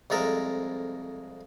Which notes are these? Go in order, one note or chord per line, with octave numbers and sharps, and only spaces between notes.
C2 F2 G#3 A4 A#4